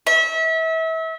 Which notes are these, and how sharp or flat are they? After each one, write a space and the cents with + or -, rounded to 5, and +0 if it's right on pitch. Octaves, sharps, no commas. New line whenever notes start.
E5 -30